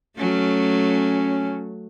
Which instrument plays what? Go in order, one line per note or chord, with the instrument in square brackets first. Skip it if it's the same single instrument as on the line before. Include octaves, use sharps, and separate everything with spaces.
[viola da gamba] F#3 A3 [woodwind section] C#4